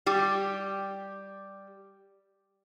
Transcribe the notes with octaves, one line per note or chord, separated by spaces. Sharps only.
G3 G4